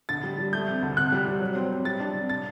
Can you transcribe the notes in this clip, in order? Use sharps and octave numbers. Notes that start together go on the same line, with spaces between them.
D3 A6
G3
G3
A3 G6
C3
D2
C3 F#6
G3
G3
F#3
C4
C4
G3 A6
D4
C3
A6